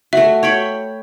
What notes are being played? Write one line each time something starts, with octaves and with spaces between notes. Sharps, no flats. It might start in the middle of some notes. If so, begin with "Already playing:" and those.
A3 F#4 E5
C#5 G5 B5